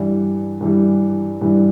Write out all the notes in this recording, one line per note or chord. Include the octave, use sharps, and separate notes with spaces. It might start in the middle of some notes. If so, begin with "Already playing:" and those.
Already playing: G2 E3 G3
G2 E3 G3
G2 E3 G3